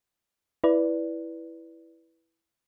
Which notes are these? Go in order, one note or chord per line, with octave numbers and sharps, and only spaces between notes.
E4 B4 D5